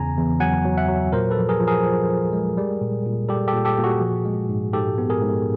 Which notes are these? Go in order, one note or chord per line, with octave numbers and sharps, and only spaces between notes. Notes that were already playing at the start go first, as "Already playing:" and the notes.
Already playing: E2 C#3 G#5 A#5
E2
F#3 F#5 G#5
F#3
E5 F#5
F#3
A#2 A#4 C5
A4 B4
F3
G#4 A#4
F3
G#4 A#4
F3
F3
G#3
G3
A#2
A#2
G3 G4 A4
G4 A4
A#2
G4 A4
A#2
F#4 G#4
F3
G#3
G#2
G#2 G4 A4
B3
G#4 A#4
G#2